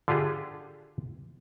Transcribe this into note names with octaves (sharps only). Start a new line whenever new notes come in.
D3 D4 F4 G4 G#4